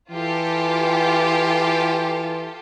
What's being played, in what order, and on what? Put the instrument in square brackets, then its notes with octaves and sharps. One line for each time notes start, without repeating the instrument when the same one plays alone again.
[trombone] E3 [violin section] F4 G4 A4